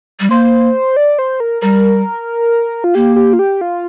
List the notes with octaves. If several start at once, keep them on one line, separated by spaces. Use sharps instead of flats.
G3
A#3 C5
D5
C5
A#4
G3 A#4
F4
A#3 G4
G4
F4
G4
F4